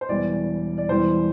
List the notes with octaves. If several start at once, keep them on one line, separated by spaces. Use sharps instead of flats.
C5
E1 E2 E3 G3 D5
D5
E1 E2 E3 G3 C5